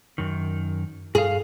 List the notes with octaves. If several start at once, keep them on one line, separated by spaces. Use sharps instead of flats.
F#2 D#3
G2 G#4 F5